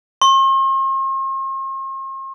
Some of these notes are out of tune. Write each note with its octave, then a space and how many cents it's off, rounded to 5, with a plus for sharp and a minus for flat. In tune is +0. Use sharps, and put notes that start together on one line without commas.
C6 +45